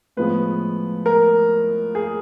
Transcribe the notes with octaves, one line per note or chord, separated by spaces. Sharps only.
A2 F3 G#3 B3 B4
A#4
G#4